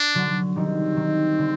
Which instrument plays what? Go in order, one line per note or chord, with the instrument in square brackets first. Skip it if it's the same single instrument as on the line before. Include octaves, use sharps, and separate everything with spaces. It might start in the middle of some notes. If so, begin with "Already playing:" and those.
Already playing: [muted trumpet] D4
[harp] D3 F#3
[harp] D#3 G3 [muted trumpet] C4
[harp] D#3
D3